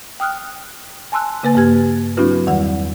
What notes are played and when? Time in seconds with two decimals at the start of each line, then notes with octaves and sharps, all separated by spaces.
0.20 G5 D#6 F6 F#6
1.12 G#5 A5 C6 E6 F#6
1.43 C#3 A#3 B4 G#5 A6
1.55 G2 A#3 G4 G#6
2.17 F#3 C4 D4 E4 F#4 B4
2.47 E2 D#3 G3 F#5